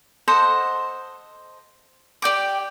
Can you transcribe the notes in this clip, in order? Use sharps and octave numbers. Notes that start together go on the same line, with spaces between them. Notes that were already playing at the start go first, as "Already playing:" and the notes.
A4 C5 D#5 F#5
G4 D5 G5 D6